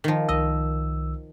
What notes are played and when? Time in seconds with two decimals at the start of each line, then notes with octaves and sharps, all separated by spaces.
0.04 D#3 F3
0.29 C2 D#3 D#5 E6